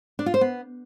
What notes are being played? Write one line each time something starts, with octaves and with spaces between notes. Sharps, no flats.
D4
F4
C5
B3